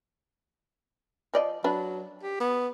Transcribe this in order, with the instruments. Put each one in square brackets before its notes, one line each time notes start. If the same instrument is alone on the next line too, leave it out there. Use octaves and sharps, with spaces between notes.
[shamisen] F3 D5 D#5
[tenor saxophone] F#3 [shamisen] D4 B4
[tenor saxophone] G4
B3